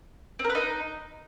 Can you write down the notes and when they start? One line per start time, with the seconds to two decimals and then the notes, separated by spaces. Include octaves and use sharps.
0.39 C4
0.44 A#4
0.50 B4
0.55 D#4